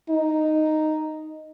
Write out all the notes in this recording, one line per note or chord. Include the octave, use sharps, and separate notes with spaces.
D#4